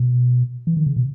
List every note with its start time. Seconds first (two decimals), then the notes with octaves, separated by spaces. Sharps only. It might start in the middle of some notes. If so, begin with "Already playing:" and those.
Already playing: B2
0.67 E3
0.77 D#3
0.86 C#3
0.96 B2